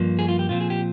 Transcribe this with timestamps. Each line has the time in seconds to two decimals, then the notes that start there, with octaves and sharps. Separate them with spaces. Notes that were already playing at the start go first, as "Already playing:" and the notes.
Already playing: G2 F3 A#3
0.19 G#4
0.28 F4
0.39 G4
0.49 A#2 F3 C4 F4
0.60 G#4
0.70 G4